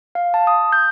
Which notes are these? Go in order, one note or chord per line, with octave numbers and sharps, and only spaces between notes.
F5
A5
D#6
G6